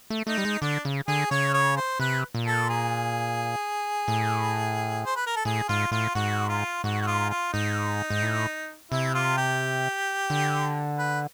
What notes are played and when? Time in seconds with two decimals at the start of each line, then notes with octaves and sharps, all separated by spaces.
0.10 A3
0.27 A3 D#4
0.38 G3
0.45 G#3
0.62 D3 D4
0.85 C#3
1.08 D3 G#4
1.31 C#3 C#5
1.54 C#5
1.77 C5
2.00 C3 B4
2.35 A#2
2.46 A4
2.69 G#4
4.08 A2
5.06 C5
5.16 B4
5.26 A#4
5.36 A4
5.45 A2 G#4
5.69 G#2 F4
5.91 A2 F4
6.15 G#2 F#4
6.49 F4
6.84 G#2 F#4
7.02 F#4
7.07 F4
7.30 F4
7.53 G#2 D#4
8.10 G#2
8.22 A2
8.92 C3 E4
9.15 F4
9.37 G4
10.30 D3
10.99 B4